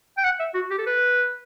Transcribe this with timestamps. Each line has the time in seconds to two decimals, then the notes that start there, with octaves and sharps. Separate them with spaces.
0.18 G5
0.24 F#5
0.39 E5
0.54 F#4
0.70 G4
0.78 A4
0.86 B4